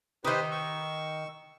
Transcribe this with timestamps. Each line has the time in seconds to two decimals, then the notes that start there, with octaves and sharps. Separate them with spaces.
0.25 D#3 D#4 G4 B4 C5
0.51 C#6 E6